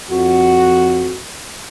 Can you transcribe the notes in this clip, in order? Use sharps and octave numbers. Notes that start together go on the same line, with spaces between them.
F2 F#4